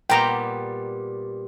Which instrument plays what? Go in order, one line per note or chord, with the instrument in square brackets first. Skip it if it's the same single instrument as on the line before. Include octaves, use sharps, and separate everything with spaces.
[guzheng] A#2 G3 B3 [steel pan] G5 A#5